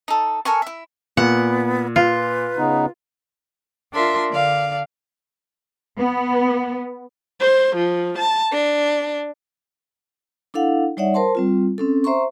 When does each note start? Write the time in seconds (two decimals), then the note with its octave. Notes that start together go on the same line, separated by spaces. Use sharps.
0.08 D#4 A4
0.45 A4 A#4 G#5 C#6
0.62 E4 E5
1.17 A#2 B3 F#5
1.96 F4 B4
2.58 C#3 B3 D#4
3.93 D4 F4 A#4 E5 C6
4.31 D3 D5 F5
5.97 B3
7.41 C5
7.76 F3
8.19 A5
8.53 D4
10.54 D4 E4 A4 F5 F#5
10.97 G3 D#4 C#5 D5 E5 F#5
11.14 A#4 C5 A5 C6
11.35 G3 C4 F4
11.78 C4 C#4 A4
12.04 C5 E5 A#5 C6 C#6